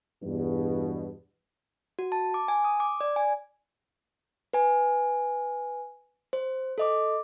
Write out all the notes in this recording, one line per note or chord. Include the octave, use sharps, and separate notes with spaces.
E2 G2 B2
F#4
A5
D6
G#5
D#6
D6
D5
G#5
B4 G#5
C5
A4 D#5 D6